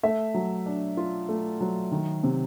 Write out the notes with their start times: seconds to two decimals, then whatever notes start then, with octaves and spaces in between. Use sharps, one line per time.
0.03 A3 E5
0.34 F#3
0.66 D4
0.97 F4
1.29 A3
1.61 F#3
1.92 D#3
2.24 C3